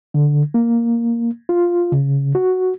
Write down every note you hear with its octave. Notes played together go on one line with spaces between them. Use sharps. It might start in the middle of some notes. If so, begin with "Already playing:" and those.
D3
A#3
F4
C#3
F#4